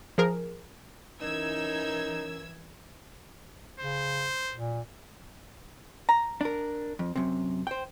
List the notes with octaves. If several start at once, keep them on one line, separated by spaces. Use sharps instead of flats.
F3 G#4 A#4
E3 C#4 D#4 A#4 E6 G#6
C#3 C5
A#2
A#5
D4 A#4
F2
F#2 C3
C5 G5